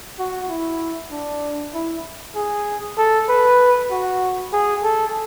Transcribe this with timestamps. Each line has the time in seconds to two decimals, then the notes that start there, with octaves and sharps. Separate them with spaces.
0.19 F#4
0.49 E4
1.11 D4
1.74 E4
2.35 G#4
2.98 A4
3.29 B4
3.91 F#4
4.53 G#4
4.84 A4